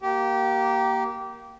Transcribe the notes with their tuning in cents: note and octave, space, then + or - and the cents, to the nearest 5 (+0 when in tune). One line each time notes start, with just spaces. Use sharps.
A#3 +0 G4 -20